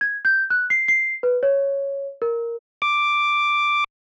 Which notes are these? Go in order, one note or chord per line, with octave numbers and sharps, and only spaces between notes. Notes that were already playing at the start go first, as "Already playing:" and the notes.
G#6
G6
F#6
C7
C7
B4
C#5
A#4
D6